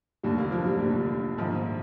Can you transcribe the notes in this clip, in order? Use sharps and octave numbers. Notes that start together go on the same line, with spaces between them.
F1 D#2 D3 G3
A#3
F3
G3
F1 D#2 D3
A#1 G#2 D#3 F3